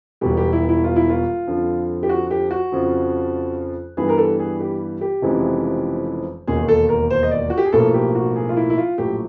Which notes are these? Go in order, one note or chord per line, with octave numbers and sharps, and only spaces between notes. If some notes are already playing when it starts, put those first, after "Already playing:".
E1 E2 B2 G3 G4
G4
E4
E4
F4
E4
F4
F2 D3 F3
G4
F#4
G4
F#4
F2 C#3 F3
G2 E3 G3 B3 G#4
A#4
A4
G#4
G4
G4
F1 F2 C#3 E3 G#3
E1 D#2 D#3 G#4
A4
A#4
C5
D#5
D5
F#4
G4
G#4
B1 A2 F3 A#3 A4
G4
F#4
G#4
F4
E4
E4
F4
A#1 A2 F#3 G4